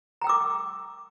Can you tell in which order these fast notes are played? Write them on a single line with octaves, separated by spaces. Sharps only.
A#5 G5 E6 D6